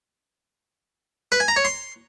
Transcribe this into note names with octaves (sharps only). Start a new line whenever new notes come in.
B4
G#5
A#5
C#5
C6